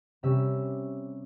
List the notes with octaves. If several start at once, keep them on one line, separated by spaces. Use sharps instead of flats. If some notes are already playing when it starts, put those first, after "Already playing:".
C3 G3 C#4 E5